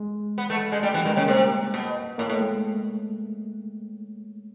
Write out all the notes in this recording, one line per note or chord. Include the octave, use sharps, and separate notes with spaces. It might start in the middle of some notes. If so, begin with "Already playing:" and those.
Already playing: G#3
B3
A3
A3
G#3
G3 A3
E3 G3
D#3 G#3
C#3 A#3
C3 A#3
B2
A2 A#3
A2 A3
G#3